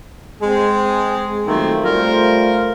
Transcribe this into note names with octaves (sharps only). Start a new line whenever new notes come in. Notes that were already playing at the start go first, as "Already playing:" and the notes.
G#3 C4 G#4
D#3 F3 F#3 A3 A#3 C4
G3 A3 F4 A#4 C5